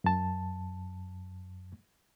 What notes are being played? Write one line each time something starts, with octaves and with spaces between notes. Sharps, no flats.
F#2 A5